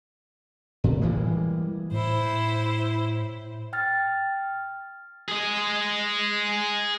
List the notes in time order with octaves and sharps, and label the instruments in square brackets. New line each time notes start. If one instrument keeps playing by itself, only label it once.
[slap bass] A2
E3 G3 G#3 A#3
[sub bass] A2 [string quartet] E4 C5
[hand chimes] G5 F6 A6
[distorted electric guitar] G#4 D#5